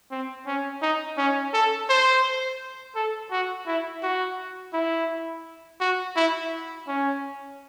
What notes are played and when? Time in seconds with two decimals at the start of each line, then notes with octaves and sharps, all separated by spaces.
0.11 C4
0.47 C#4
0.82 D#4
1.18 C#4
1.54 A4
1.89 C5
2.96 A4
3.31 F#4
3.67 E4
4.02 F#4
4.73 E4
5.81 F#4
6.16 E4
6.87 C#4